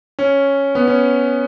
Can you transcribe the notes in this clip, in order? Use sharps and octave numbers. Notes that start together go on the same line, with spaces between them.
C#4
B3
C#4